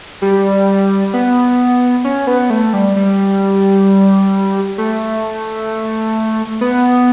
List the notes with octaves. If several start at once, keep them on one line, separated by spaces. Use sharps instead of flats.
G3
B3
C#4
B3
A3
G3
G3
A3
B3